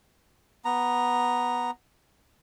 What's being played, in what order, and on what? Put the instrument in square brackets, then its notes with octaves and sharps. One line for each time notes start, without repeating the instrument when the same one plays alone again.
[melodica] B3 A#5